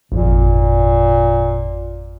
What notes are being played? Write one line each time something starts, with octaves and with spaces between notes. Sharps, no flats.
G#1 F2 A#2